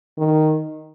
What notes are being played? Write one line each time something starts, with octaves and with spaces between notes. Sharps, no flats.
D#3